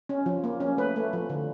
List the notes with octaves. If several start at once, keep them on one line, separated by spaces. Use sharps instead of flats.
C#4
F3
A#3
C#4
A3 B4
A3
F3
D3